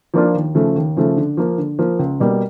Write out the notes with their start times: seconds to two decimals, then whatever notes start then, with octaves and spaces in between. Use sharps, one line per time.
0.14 F3 A#3 D4 F4
0.35 D#2
0.55 C#3 F3 A3
0.75 D#2
0.97 C#3 F3 A3
1.17 D3
1.37 F3 A#3
1.58 D3
1.79 F3 A#3
1.99 C#2
2.20 B2 G3 A#3